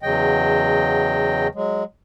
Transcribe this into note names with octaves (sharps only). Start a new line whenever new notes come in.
E2 C#3 F#3 D#5 G5
F#3 G#3